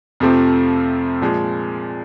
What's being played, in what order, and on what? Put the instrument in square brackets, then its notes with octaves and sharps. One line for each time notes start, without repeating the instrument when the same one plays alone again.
[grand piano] F2 C3 F3 A3 C4
A#2 F3 G#3